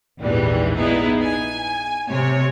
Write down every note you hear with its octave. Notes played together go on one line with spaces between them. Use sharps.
A#1 E2 G#2 E3 G3
B3 D#4 E4 G#4
G#5
C3 C#5